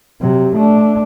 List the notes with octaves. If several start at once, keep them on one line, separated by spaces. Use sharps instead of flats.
C3 F#3
A3 D4